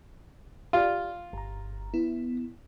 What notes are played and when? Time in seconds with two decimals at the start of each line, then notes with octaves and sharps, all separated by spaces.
0.73 F4 G4 D5
1.33 G1 A#5
1.94 B3 E4